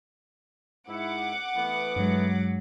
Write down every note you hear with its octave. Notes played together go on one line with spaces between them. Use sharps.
G#2 D#4 E4 F#5 D6
E3 A3 B3
G2 F#3 G#3